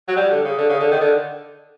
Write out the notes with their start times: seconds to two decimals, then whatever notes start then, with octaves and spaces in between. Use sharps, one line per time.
0.08 F#3
0.16 G3
0.30 D3
0.44 C#3
0.58 D3
0.69 C#3
0.80 D3
0.91 D#3
1.01 D3